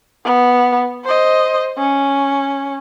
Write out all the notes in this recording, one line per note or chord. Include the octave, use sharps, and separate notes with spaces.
B3
C5 D#5
C#4